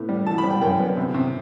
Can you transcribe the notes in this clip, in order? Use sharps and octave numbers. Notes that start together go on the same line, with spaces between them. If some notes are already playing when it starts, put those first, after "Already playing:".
Already playing: A2 B3
G3
E3 A5
B5
G3
G5
F#2 G5
B3
C3
C3